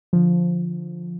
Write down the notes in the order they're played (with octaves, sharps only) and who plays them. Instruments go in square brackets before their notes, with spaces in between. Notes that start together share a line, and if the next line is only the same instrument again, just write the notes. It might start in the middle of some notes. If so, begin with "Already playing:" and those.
[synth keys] D3 F3